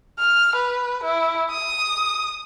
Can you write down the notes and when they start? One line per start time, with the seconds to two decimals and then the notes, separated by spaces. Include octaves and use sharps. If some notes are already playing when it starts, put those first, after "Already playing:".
0.20 F6
0.56 B4
1.04 E4
1.51 D#6